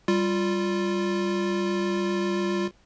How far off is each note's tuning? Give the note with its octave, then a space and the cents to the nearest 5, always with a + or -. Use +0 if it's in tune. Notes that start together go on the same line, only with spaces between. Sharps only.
G3 +0 F4 +0